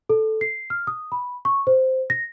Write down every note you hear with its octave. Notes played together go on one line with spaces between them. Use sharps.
A4
C7
F6
D#6
B5
C#6
C5
A#6